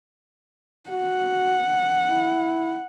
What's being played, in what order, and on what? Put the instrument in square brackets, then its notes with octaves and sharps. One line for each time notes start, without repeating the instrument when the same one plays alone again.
[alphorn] F#4 [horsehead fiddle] F#5
[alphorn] E4